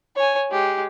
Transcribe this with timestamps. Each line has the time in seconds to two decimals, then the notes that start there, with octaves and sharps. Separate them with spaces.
0.16 C#5 G#5
0.51 G#3 G4